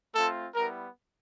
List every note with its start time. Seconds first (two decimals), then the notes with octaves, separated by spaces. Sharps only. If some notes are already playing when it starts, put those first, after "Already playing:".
0.14 A3 C4 F4 A4
0.54 G3 B3 E4 A#4